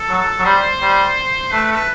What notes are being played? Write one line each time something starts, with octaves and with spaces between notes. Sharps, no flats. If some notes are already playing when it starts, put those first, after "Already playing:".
Already playing: A4
F#3
F#3
G3 C5
G3
A3 B4
B4
A4
B4